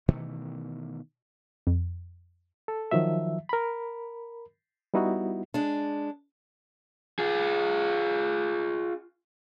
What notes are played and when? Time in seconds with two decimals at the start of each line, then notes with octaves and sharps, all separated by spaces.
0.08 B2 D#3 E3 A3
1.67 F2
2.68 A4
2.91 D#3 F3 F#3 E5
3.49 A#4 B5
4.94 G3 B3 D#4 E4 F#4
5.54 G#3 D4
7.19 F4 G#4